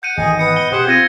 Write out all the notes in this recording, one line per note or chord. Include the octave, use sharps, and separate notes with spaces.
F#5 G6 C#7 D#7
G#1 G#2 E3 G#4 D#5
B3 D#6 C#7
G7
B2 G4 G#4 C5 F#5
C4 F4 G#6 A#6 D#7